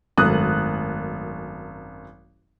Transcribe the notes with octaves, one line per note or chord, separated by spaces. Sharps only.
G#1 F#2 A3 A#4 D#6 F#6